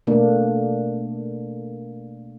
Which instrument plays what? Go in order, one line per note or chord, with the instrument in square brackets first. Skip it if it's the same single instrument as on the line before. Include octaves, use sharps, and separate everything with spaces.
[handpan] B2 A3 A#3 D4